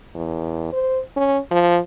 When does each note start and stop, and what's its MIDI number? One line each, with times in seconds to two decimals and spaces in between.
0.15 0.72 40
0.72 1.00 72
1.17 1.38 61
1.51 1.78 53